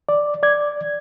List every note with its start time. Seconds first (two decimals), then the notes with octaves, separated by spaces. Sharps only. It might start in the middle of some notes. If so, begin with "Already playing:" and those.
0.09 D5
0.43 D5 G#6